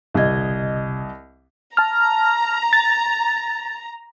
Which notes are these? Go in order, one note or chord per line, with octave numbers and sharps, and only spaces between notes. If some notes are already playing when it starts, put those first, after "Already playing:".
G1 C2 C3 D#5 G#6
A5 A#5 F6
A6